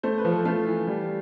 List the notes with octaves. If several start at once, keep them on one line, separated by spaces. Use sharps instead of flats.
A3 C5
B4
F3
A4
A3 F4
E3
G3